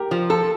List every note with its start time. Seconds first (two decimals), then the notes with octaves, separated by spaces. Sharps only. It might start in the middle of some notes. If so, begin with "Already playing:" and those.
Already playing: G4 A#4
0.11 F3
0.30 F4 A4